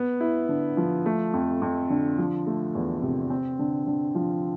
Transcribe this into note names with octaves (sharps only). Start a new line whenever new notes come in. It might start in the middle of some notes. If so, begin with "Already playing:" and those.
Already playing: B3
E4
D3
F3
A3
F2
F2
D3
F3
A3
E2
C3
C4
D3
D3
F3